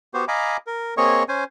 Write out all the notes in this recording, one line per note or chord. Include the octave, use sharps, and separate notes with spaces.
B3 F#4 G4 C5
D#5 F5 G#5 A#5 B5 D6
A#4
A#3 C4 G#4 C#5 D#5 C#6
C#4 C5 G#5